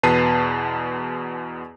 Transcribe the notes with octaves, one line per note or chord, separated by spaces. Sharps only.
E2 B2 B4 A5 C7 D#7